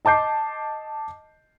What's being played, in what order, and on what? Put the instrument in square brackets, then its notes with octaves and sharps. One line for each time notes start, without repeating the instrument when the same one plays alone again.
[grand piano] D#5 A5 D6 G6 C7